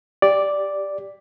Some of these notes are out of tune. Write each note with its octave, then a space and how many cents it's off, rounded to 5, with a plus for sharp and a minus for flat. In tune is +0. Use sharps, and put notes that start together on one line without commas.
G4 +10 D5 +0